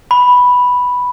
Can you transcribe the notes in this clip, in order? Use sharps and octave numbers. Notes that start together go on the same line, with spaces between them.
B5